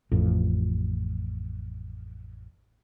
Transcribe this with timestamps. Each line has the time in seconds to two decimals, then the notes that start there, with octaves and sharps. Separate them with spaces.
0.11 A1 F2